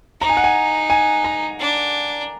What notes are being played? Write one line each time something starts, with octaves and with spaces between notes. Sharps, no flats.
D#4 A#5
G#5
F#5
G#5
G#5
A#5
D4